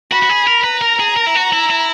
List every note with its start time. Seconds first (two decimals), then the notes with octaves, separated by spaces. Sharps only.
0.11 F#4 B5
0.22 F#4
0.29 G#4
0.47 A#4
0.64 B4 A#5
0.81 A#4
1.00 G#4
1.17 A#4
1.27 E4
1.35 F#4
1.53 E4
1.71 E4